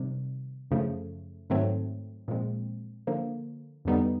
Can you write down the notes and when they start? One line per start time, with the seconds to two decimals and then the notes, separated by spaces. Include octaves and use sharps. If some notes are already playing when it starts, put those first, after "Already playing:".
Already playing: C3 D#3 G3
0.71 F#2 C#3 F3 A3
1.50 G#2 D#3 F#3 A3 C4
2.28 A#2 F3 G#3 C4
3.07 D3 F3 A#3
3.85 F2 D3 G3 B3 D#4